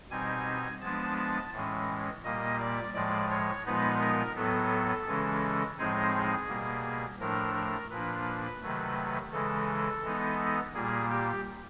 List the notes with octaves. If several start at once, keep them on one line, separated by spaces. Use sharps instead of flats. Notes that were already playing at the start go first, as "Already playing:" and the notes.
B2 G3 C4 D#4 G#5
F3 G#3 B3 D4 A5
A5
A2 E3 G#3 C#4
A#2 G3 A#3 D#5
D5
A2 F3 G#3 D5
C#5
A#2 F3 G#3 B3 D#4 B4
A#4
A2 F#3 B3 A4
C#3 E3 G#3 C#4
A2 F3 G#3 C4 D#4 G#4
B2 G3 A#3
A2 F3 A3 D4 A#4
A#4
A#2 F3 A#3 D4 B4
C3 D#3 F#3 A3
C#3 E3 G#3 A4
E3 G#3 B3 D#4
A#2 G3 A#3 G#4
G4